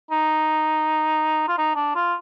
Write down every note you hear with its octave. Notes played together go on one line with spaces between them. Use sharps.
D#4
F4
D#4
D4
F4